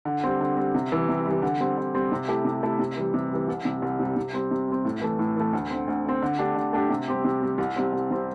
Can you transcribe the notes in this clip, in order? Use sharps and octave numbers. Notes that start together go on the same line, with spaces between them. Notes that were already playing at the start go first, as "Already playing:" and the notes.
D3
G3 C4
D3
G3 C4
C3
E3 G3
C3
E3 G3
D3
G3 C4
D3
G3 C4
C3
A3 E4 G4
C3
A3 E4 G4
C3
E3 G3
C3
E3 G3
C2
C3 G3
C2
C3 G3
C3
G3 C4
C3
G3 C4
A2
E3 A3
A2
E3 A3
D2
D3 C4
D2
D3 C4
D3
A3 D4 G4
D3
A3 D4 G4
C3
G3 C4 G4
C3
G3 C4 G4
C2
C3 G3 C4
C2
C3 G3 C4